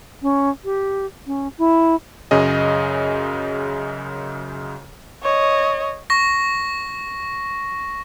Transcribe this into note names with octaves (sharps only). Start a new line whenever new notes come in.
C#4
G4
C#4
E4
F#2 C#3 G#4 D#5
C#5 D#5
C#6 A#6